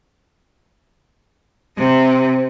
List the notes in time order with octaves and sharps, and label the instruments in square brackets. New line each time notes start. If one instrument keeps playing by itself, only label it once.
[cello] C3 C4